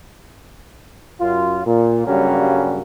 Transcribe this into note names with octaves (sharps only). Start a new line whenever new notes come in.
F#2 F4
A#2
G2 C#3 F#3 G3 A#3 C#4